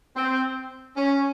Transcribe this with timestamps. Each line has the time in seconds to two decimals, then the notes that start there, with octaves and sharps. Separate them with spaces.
0.17 C4
0.97 C#4